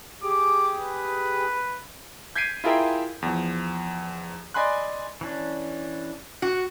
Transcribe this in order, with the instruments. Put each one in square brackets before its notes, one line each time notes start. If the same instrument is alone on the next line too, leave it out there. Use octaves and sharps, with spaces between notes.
[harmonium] G4 G#4 [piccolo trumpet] D6
[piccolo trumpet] B4
[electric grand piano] G6 G#6 B6 C7 D7 D#7
E4 F4 G#4 A#4 E5 G5
E2 F3
D5 D#5 G#5 B5 C6 F#6
[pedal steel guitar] E3 C#4 D4
[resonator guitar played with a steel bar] F#4 [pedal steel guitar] F#5